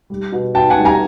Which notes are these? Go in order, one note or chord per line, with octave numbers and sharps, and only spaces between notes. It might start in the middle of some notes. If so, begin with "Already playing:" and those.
G3
B2
B2 G5 A5
F#5 G#5
G3
G#5 A#5